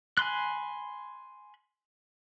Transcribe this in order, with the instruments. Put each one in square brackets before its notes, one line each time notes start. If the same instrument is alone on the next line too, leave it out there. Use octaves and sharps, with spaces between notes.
[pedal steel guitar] G#5 B5 C6 F#6